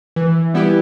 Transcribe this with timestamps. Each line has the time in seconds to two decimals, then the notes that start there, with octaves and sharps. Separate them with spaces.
0.16 E3
0.54 G3 B3 E4 G4